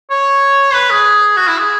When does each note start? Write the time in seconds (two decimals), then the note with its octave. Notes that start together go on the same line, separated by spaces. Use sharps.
0.10 C#5
0.74 B4
0.90 G#4
1.37 F#4
1.48 E4
1.58 G#4